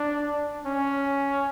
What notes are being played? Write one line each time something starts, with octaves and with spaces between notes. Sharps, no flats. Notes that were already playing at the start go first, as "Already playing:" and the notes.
Already playing: D4
C#4